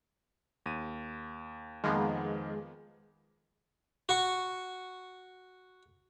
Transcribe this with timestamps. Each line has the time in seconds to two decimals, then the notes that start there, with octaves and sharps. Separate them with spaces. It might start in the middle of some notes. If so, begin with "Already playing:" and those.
0.66 D#2 D#7
1.84 F2 D#3 F3 G#3 A#3 B3
4.09 F#4 C#6